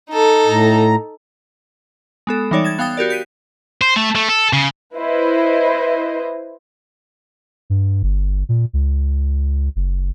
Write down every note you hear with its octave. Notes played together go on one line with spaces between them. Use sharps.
D#4 A4
A2 A#5
G#3 B3 A4
E3 G3 D#4 C#5 D5
G#6 A6 E7
B3 F5 G5 D#6 A6
F#4 G4 A#4 D5
G6 B6 D#7
C5
A3
A3
A4
C#3
E4 B4 C5 D#5
G2
G1
A#2
C#2
F#1